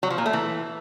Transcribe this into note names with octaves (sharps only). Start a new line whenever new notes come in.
F#3
F3
A#2
A3
E3